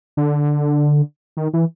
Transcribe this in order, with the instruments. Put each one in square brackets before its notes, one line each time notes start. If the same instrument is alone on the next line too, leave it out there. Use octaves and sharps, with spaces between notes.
[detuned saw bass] D3
D#3
E3